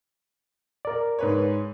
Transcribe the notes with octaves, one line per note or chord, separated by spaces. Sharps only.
A#4 D5
G#2 B4 C#5